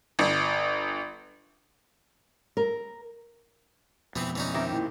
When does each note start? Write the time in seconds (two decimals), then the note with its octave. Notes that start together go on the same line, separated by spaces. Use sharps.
0.19 G1
2.57 A#4
4.16 F2 B2 E3 B3 C4
4.36 E3 C#4 D#4
4.54 D#3 C4 G4 E5
4.72 A#2 E4